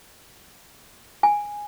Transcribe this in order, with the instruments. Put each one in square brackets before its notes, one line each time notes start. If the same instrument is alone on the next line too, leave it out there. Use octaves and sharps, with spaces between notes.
[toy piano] G#5